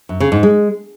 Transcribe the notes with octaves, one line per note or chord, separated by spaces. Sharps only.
F#2
C#3
G#2
G#3